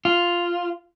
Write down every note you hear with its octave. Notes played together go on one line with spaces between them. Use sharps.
F4